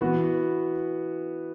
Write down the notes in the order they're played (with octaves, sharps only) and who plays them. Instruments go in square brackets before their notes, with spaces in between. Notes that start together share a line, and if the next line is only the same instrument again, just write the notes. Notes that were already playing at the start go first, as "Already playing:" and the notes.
[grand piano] E3 B3 F#4